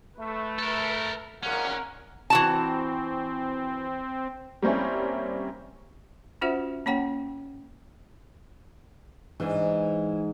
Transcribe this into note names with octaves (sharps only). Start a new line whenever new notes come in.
A3 B4
A4 A#4
G#1 A#2 C#4 A#4 F#5
E3 C4 F#4 A5
G3 A#3 C4 C#4 E4
C#4 F4 F#4 C5 E5 F#5
A#3 C#4 C#5 F#5 G5
G#2 E3 D4